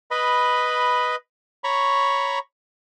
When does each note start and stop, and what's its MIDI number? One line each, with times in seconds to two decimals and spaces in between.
0.11 1.16 71
0.11 1.16 75
0.11 1.16 83
1.64 2.39 73
1.64 2.39 82
1.64 2.39 83
1.64 2.39 85